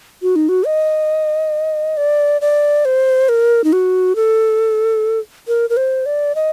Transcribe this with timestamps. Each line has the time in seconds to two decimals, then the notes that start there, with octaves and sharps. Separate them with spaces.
0.22 F#4
0.36 D#4
0.49 F#4
0.66 D#5
1.97 D5
2.41 D5
2.85 C5
3.29 A#4
3.64 D#4
3.73 F#4
4.16 A4
5.48 A#4
5.70 A#4
5.77 C5
6.06 D5
6.35 D#5